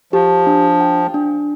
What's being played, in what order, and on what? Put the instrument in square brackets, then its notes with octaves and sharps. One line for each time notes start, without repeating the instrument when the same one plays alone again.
[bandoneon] F3 [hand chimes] G4
[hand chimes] D4
G5
D4